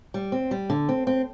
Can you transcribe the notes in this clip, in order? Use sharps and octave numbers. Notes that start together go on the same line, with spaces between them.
G3
C4
G3
D3
C4
C4